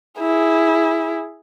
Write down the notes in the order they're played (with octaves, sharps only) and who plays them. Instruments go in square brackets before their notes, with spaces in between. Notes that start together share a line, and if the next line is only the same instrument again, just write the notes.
[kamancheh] E4 G#4